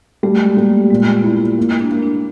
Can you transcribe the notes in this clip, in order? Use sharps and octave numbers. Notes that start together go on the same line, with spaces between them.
G3 A3
G#3
G3 A#3
A3
A#2 G#3
B3
A#3 E4
A#3
D4
A#3
D4